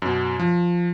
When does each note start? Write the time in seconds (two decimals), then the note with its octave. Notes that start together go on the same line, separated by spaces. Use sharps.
0.02 F#2 B2
0.39 F3